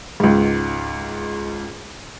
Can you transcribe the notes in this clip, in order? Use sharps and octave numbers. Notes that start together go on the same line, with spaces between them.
C#2 G#2